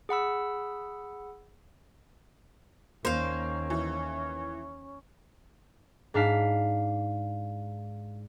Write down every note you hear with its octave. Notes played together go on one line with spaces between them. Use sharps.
G#4 F#5 B5 E6
D#2 A#3 C#4 C5 F5
E3
G#2 D4 F5 B6